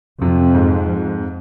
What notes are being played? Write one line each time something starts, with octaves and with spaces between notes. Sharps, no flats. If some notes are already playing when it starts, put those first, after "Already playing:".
F2 C3
G#2